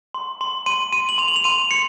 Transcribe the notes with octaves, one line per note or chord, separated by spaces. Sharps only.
C6
C6
C6 D#7
C6 D#7
F#7
C6 F7
F#7
F7
C6 D#7
C6 C#7